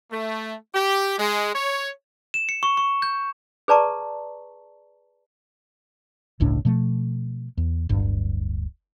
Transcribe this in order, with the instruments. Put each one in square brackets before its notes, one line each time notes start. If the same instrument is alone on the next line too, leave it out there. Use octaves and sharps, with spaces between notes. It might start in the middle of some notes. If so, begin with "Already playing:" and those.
[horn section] A3
G4
G#3
C#5
[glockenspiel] E7
C#7
C#6
C#6
G6
[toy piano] G#4 B4 D5 A5 A#5 C#6
[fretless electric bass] G1 C#2 A2 D4
B2 F3 A3
E2
D1 G1 G2